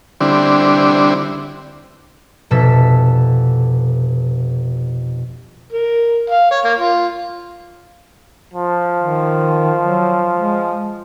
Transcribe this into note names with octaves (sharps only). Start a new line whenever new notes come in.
D3 G3 C4 D4 E4
F1 B2 A4 E5 B6
A#4
F5
C#5
A#3
F4
F3
D#3
F#3
G#3